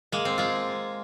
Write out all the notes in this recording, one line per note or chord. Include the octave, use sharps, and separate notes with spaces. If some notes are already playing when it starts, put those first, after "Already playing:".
G#3 A#3
C4
G#3 F4